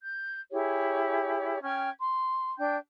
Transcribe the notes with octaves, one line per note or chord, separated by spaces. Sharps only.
G6
E4 G4 G#4 C#5
C#4 G5 F6 G#6
C6
D4 G5 G6